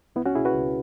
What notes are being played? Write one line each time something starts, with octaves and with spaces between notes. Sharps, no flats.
C#2 B3 E4
C#4 F#4
B2 E4 G#4
F#4 B4
C#2